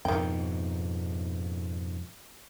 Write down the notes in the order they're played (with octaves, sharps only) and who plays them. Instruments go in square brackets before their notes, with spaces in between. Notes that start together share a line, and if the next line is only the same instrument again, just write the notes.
[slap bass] F2 G#2 B2 [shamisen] D#3 G5